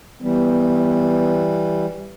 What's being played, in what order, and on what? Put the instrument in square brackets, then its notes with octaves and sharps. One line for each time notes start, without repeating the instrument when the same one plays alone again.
[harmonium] E3 G3 [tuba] B3